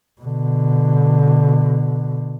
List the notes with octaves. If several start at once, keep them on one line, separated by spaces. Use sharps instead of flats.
B2 D3